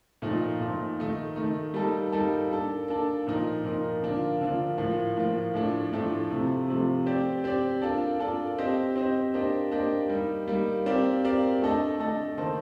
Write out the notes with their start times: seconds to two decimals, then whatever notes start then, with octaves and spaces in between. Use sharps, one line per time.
0.22 A#2 F3 A3 D#4
0.60 A#2 F3 A3 D#4
0.98 D#3 A3 D#4
1.36 D#3 A3 D#4
1.74 G3 A#3 D#4 A4
2.12 G3 A#3 D#4 A4
2.50 A#3 D4 A4
2.88 A#3 D4 A4
3.27 A#2 F3 A#3 D#4 A#4
3.64 A#2 F3 A#3 D#4 A#4
4.02 D3 F3 A#3 D4 F4
4.41 D3 F3 A#3 D4 F4
4.78 A2 F3 A#3 F4
5.17 A2 F3 A#3 F4
5.54 A2 F3 A3 D4
5.92 A2 F3 A3 D4
6.30 C3 F3 A3
6.68 C3 F3 A3
7.06 C4 G4 D5
7.44 C4 G4 D5
7.82 A#3 D4 F4 A4 D5
8.19 A#3 D4 F4 A4 D5
8.59 C4 G4 C5 D#5
8.96 C4 G4 C5 D#5
9.34 A#3 D4 G4 C5 D#5
9.72 A#3 D4 G4 C5 D#5
10.09 G3 A#3 D#4
10.48 G3 A#3 D#4
10.86 C4 G4 A#4 D5 F5
11.24 C4 G4 A#4 D5 F5
11.62 A3 D4 A4 D#5
11.99 A3 D4 A4 D#5
12.38 D#3 A#3 D#4 A4 C5